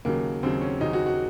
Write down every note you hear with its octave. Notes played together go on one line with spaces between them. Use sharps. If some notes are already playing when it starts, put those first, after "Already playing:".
D#2 C#3 F#3 A#3
D#2 C#3 F#3 C4
C#4
D#2 C#3 F#3 D#4
F#4
F#4